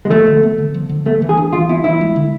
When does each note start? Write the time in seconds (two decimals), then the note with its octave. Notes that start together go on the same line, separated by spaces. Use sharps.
0.05 G#3
0.11 F3 A3
0.27 D3
0.43 B3
0.58 D3
0.74 F3
0.89 D3
1.05 A3 B3
1.22 E3
1.29 G#4
1.37 D4
1.53 E3 F4
1.69 B3 E4
1.84 E3 E4
2.01 G#3
2.16 D3